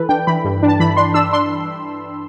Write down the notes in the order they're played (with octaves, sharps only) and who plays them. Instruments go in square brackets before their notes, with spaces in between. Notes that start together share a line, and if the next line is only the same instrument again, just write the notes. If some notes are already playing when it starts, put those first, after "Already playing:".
Already playing: [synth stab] E3 A4 B4
D4 G5
E3 B5
G2
D4
A5
E3 B5
D4 C6
D4 E6
D4 C6